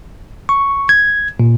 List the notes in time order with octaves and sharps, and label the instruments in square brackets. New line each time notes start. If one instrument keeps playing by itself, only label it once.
[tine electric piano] C#6
G#6
A#2